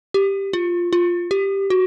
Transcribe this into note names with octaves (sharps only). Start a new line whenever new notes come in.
G4
F4
F4
G4
F#4